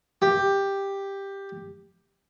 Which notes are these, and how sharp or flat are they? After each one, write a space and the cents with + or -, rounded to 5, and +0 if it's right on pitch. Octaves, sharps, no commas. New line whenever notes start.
G4 +5